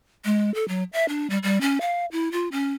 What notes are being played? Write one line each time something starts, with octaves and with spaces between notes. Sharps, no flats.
G#3
A4
F#3
E5
D4
G3
G3
C#4
F5
E4
F4
C#4